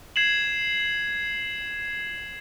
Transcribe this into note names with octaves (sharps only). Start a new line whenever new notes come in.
G#6 C7 E7 F#7